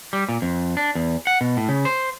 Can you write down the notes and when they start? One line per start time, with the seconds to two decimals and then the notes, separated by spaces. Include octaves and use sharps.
0.13 G3
0.29 A#2
0.42 F2
0.77 D4
0.95 E2
1.27 F#5
1.41 B2
1.57 A2
1.69 C#3
1.85 C5